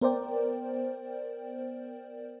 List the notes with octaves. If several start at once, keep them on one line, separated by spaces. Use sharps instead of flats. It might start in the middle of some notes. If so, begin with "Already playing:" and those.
B3 A#4 C5 D5 G5